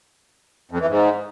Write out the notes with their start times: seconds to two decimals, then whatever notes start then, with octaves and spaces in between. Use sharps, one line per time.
0.71 F2
0.80 E3
0.89 G#2